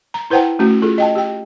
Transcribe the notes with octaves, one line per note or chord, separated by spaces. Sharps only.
A#5
E4 B4 C5 F#5 G5 A5
A3 C#4 F#4
F4 G#4 A4
D#5 G5 A5
G4 G5